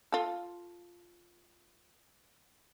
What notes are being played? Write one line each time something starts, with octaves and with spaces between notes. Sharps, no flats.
F4 A4